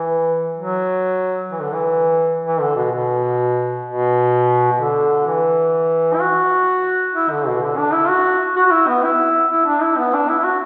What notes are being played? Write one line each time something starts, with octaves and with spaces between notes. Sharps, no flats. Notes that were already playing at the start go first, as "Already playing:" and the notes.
Already playing: E3
F#3
E3
D3
E3
E3
D3
B2
B2
B2
B2
D3
E3
E4
F#4
E4
D3
B2
D3
D4
E4
F#4
F#4
F#4
E4
B3
E4
E4
D4
E4
B3
D4
E4
E4
F#4